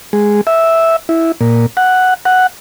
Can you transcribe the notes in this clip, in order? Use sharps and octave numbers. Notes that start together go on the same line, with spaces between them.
G#3
E5
E4
A#2
F#5
F#5